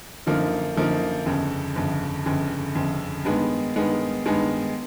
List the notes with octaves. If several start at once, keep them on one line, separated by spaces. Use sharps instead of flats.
F#2 D3 F3 A#3 D#4
F#2 D3 F3 A#3 D#4
G1 F2 C#3
G1 F2 C#3
G1 F2 C#3
G1 F2 C#3
G2 D#3 G#3 B3
G2 D#3 G#3 B3
G2 D#3 G#3 B3